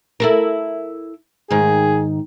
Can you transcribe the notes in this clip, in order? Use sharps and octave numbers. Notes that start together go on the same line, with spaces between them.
E4 A4 A#4
G#2 D#3 G#4